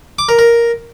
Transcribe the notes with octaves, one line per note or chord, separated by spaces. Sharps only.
D6
A#4
A#4